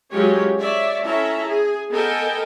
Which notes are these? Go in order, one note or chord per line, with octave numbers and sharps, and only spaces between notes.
F#3 G#3 C#4 F4 G4 C#5
C#5 D5 E5
C#4 E4 A4 E5 A5 A#5
G#4
B3 A4 A#4 D#5 G5 G#5